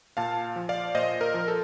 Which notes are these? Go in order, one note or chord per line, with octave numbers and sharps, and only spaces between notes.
A#2 F5 A5
F3
D5 F5
A#2 C5 D#5
A#4
F3
A4